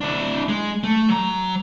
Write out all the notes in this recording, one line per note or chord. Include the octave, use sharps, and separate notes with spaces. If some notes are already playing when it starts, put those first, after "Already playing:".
D4 E4
G#3
A3
F#3 A#5